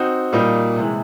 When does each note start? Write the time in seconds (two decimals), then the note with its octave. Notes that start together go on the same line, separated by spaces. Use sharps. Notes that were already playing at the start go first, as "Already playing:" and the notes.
Already playing: C4 D#4 F#4
0.33 A#2 G3 A#3 D#4
0.76 C3 E3 G#3